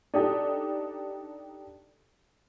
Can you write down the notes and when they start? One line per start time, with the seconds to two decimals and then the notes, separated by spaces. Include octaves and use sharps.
0.14 D4 D#4 G4 A4